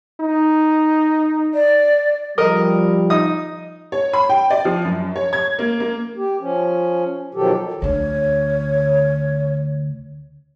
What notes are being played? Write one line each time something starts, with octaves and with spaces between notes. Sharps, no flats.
D#4
D5
F3 G3 A#4 D#5
D#4 D#6
C#5
B5
G5
D5
F3
F#2
C#5
G#6
A#3
A#3
G4
F3 C#4
B2 D#3 F3 F#3 G4 A4
D2 D3 C#5